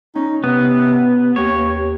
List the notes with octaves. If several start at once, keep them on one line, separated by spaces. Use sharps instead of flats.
C#4 D#4
C3 B3
D#2 A#3 G4 C#5